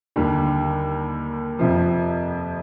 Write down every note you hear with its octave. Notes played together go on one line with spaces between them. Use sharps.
D#2 D3 G3
F2 C3 F3